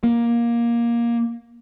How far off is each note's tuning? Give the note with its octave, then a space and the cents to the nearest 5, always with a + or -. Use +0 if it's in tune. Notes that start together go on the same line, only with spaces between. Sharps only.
A#3 +15